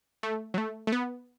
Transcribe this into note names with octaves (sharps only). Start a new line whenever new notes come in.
A3
F#3
A3
A3
B3